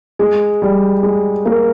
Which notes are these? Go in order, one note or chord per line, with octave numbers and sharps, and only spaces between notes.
G#3
G3
G#3
A#3